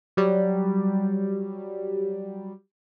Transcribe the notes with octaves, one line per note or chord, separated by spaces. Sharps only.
F#3 G3